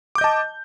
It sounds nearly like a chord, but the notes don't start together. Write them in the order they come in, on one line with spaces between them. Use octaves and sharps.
D6 G6 D#5 A5